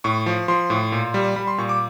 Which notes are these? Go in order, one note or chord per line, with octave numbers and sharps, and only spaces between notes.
A2 C#6
F3
F3 C6
A2
A#2
G3
G3 B5
C6
A#2 C#6
D6